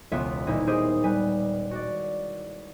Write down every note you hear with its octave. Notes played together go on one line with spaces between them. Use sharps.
E1 C#2 B3 F4 C#5 E5
D#1 D#4 E4
G4 G#4 A#4 C5
G3 B4 G#5
F#4 D5